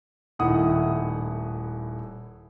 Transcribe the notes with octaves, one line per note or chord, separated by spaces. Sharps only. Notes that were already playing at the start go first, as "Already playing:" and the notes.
D#1 A2 D#3 E4 F#5 D#6